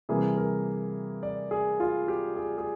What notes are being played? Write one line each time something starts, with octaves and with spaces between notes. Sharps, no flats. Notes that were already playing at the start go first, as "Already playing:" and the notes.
C3 E3 G3 A#3 G#4
A#4
D5
G#4
F4
G4
G#4
G#4